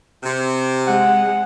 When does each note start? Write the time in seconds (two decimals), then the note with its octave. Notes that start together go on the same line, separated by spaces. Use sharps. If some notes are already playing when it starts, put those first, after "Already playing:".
0.23 C3
0.87 G#3 F#5